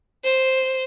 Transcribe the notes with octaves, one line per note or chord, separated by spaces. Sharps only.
C5